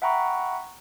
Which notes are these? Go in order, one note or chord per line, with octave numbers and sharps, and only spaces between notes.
E5 F#5 G5 A#5 B5 C#6